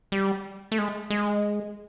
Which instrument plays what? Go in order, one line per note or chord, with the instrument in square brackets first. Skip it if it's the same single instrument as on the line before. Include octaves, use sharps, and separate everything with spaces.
[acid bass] G3
A3
G#3
G#3